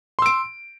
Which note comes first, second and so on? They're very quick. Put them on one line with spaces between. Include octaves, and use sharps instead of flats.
C6 E6 D7